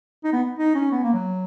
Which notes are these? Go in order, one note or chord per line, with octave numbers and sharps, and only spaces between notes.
D#4
B3
D#4
C#4
B3
A#3
F#3